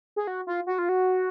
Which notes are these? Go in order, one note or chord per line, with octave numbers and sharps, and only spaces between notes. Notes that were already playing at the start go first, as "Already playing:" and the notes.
G#4
F#4
F4
F#4
F4
F#4